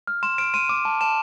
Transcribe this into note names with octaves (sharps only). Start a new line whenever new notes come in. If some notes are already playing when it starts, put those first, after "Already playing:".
F6
C6 E7
F6 D7
C6 D#7
D6
A5
A5 E7